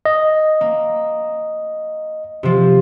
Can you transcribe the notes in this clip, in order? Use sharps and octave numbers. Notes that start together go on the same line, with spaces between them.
D#5
A#3
C3 F3